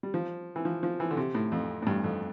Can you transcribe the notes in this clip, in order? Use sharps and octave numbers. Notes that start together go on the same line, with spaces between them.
G3
F3
E3
F3
F3
E3
D3
C3
A2
F2
A2
G2
F2